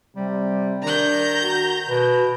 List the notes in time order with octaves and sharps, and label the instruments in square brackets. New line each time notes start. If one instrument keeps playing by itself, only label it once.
[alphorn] C3 [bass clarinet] G3
[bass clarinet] D#3 [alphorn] D4 [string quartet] A#5 G6
[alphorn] F#4
[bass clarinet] B2 [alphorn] B4